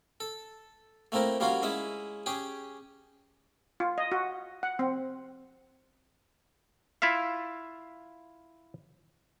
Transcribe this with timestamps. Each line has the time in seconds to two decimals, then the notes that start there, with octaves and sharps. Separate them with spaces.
0.20 A4
1.12 A3 A#3 C4 E4 A#4
1.40 G3 A#3 C#4 F4 F#4 F5
1.62 G#3 C#4 E4 E5
2.26 C#4 G4 G#4
3.80 F4
3.98 D#5
4.12 F#4
4.63 F#5
4.79 C4
7.02 E4 F4 E5 F5